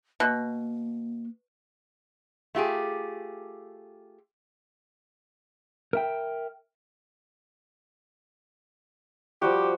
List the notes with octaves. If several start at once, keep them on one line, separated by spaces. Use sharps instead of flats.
B2 A#3
A3 F4 G4 G#4
A#4 E5 G5
F3 G3 F#4 G4